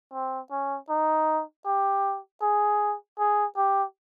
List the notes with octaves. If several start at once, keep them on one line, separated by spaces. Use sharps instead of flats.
C4
C#4
D#4
G4
G#4
G#4
G4